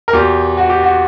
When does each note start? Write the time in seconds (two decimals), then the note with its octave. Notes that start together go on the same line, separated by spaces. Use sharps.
0.08 A#4
0.13 E2 B2 G4
0.57 F#4
0.70 G4
0.82 F#4